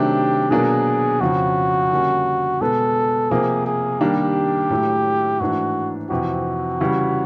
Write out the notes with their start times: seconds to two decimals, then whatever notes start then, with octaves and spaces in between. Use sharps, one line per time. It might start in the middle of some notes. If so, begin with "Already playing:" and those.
Already playing: C3 D#3 F#3 A3 D4 G4
0.51 B2 F#3 A#3 D4 G#4
1.21 F2 C#3 F3 F#4
1.91 D3 G3 A#3 C#4
2.61 B2 G#3 B3 A4
3.31 C3 F3 A#3 G#4
3.67 G#4
4.00 D#3 G3 A#3 D4 G4
4.70 A2 F#3 A3
5.40 G#2 E3 A3 D4 F#4
6.10 F2 C3 E3 F#4
6.81 C#3 E3 G3